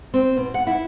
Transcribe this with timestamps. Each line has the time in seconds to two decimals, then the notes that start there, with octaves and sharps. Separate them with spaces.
0.14 C4
0.36 B2
0.54 F#5
0.67 E4